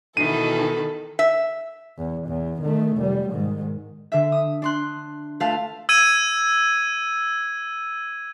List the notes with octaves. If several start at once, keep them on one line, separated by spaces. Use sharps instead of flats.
B2 D#3 E3 A4 B4 D#7
E5
E2
E2
D#3 A3
F1 G3
G#2 D#3
D3 E5
D#6
D4 C6 F#6
A3 F4 B4 F5 A5
E6 G#6 D#7